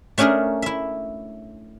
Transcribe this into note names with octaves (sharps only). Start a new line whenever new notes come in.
A3 C#4 D4 G#4 A#4
E4 E5